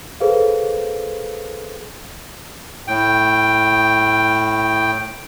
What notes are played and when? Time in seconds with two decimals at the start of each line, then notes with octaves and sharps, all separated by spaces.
0.20 G#4 A4 B4 C5 F5
2.88 A2 G5